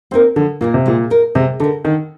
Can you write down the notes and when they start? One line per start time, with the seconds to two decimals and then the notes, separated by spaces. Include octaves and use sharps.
0.11 A#3 C4 D#4 A#4
0.36 D3 F3
0.61 A#2 A#3 D#4 A#4
0.74 C3
0.86 A#2 G#3
1.10 D#4 A#4
1.35 C3 G#3
1.60 D3 D#4
1.64 A#4
1.85 D3 D#3